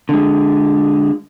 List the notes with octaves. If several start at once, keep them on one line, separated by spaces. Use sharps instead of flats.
D3 G#3